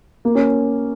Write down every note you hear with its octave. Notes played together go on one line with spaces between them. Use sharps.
A#3
C#4